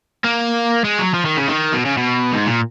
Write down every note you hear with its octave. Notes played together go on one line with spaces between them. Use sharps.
A#3
G#3
F#3
F3
D#3
C#3
D#3
B2
C#3
B2
G#2
A#2